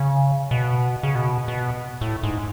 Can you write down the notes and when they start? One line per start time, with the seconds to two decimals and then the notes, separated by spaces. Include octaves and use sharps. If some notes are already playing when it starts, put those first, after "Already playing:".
Already playing: C#3
0.51 B2
1.03 C#3
1.15 B2
1.48 B2
2.01 A2
2.23 G#2